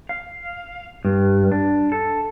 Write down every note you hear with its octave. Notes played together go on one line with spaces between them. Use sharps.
F5
G2
D4
A4